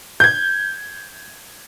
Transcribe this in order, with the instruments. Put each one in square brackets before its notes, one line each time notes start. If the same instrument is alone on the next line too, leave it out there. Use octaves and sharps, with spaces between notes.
[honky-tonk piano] G6 G#6